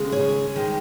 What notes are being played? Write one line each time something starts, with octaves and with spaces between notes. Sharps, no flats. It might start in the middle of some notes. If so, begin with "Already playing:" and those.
Already playing: D#2 C#3 G#3
G#4 C#5
D#3 G#3